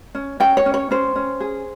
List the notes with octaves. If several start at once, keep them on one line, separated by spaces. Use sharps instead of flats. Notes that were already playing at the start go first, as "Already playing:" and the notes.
C#4
C#4 G5
C#5
C#4
C#5
C#4 C5
C#4
G#4